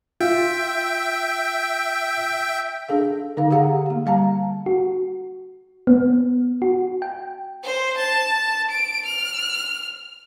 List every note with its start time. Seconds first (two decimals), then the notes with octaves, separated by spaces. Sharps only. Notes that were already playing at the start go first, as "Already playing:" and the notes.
0.21 F4 E5 G5
2.89 D4 G#4 A4 F5
3.37 D3 D#4 A4 F5
3.50 G4 G#4 F5 F#5 A#5
3.86 A#3 G4
4.06 G3 F5 A5 A#5
4.66 F#4
5.87 B3
6.62 F#4
7.02 G5
7.64 C5
7.97 A5
8.71 D7
9.05 F6